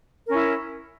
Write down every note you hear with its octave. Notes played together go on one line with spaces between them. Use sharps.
C#4 E4 A#4